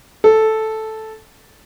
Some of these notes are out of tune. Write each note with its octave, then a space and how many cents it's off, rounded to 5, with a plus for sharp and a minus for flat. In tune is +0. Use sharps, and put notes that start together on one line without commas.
A4 -5